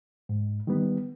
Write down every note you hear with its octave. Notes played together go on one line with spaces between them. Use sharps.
G#2
D#3 G3 B3